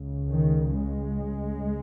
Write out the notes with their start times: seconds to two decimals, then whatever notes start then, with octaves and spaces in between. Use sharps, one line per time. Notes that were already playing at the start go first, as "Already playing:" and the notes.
Already playing: C#2 C#3
0.30 D#3
0.76 G#3